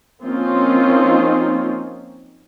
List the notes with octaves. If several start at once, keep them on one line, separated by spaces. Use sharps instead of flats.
F3 A#3 C4 C#4 D#4 F4